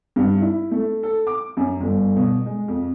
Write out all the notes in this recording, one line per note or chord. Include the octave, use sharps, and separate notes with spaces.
G2
E4
A3
A4
D6
F#2
G1
B2
G#3
F2